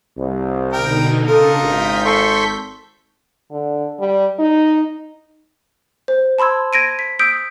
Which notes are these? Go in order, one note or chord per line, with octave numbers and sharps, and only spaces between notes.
C2
B2 D3 D#4 A#4 G5
C#3 D4 D#4 F4 A4 A#4 C#7
G#1 G6 B6
A4 C6 C#6
D3
G3
D#4
C5
A5 B5 C6 E6 G#6
G#6 A#6 D7 D#7
B6
D#6 E6 G6 B6 D7